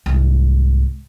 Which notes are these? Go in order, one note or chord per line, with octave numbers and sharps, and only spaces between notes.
C2 G#2